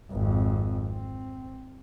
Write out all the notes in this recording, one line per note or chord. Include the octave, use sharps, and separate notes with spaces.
G#1 F2
C4